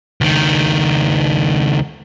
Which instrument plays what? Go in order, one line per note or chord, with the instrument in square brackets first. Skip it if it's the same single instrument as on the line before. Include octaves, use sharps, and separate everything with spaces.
[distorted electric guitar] C#2 D#3